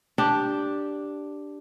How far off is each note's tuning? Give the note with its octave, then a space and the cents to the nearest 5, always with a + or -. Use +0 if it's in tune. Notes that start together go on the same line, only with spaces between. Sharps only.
D4 +0 G4 +0